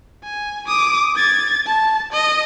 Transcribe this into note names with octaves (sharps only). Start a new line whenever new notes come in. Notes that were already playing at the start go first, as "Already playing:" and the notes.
G#5
D6 D#6
G#6 A6
A5
D#5